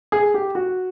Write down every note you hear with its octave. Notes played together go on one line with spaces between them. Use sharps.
G#4
G4
F#4